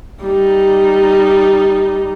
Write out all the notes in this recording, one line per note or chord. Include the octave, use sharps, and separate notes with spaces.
G3 D#4